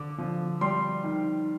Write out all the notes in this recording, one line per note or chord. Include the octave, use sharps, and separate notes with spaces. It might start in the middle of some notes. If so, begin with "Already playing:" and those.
Already playing: D3 D6
F3
G3 C6
D#3